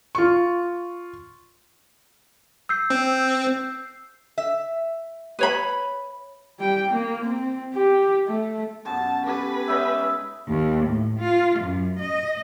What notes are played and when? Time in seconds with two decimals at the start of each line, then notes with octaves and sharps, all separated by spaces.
0.15 F4 C#6
2.69 E6 G6 C7
2.90 C4
4.38 E5
5.39 B4 C#5 B5
6.59 G3 G5
6.90 A#3
7.24 C4
7.74 G4
8.27 A3
8.85 F#2 B2 A5
9.26 G4 A4 B4 G#5
9.68 G#2 C#4 D#5 E5
10.49 D#2
10.86 A2
11.19 F4
11.59 F#2
11.99 D#5